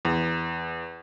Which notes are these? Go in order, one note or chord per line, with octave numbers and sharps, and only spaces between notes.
E2